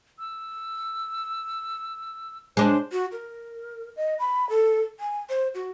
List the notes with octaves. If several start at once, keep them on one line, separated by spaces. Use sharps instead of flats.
E6
G#3 D4 C5
F#4
A#4
D#5
B5
A4
G#5
C5
F#4